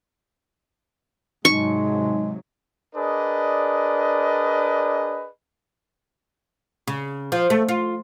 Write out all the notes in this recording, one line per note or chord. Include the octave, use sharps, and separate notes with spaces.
G#2 C3 F#3 G#3 D#4 C#6
D4 G#4 A#4 B4 D5 D#5
C#3
F3
A3
F4